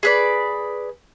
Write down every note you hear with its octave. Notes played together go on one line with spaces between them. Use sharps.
G#4 B4 D5